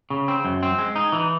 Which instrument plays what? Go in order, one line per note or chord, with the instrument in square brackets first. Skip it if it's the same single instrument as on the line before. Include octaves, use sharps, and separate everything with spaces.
[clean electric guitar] C#3
C4
F#2
C4
G#3
D#4
E3